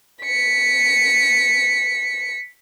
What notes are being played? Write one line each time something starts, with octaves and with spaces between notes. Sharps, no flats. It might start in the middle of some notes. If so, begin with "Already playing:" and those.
B6 C#7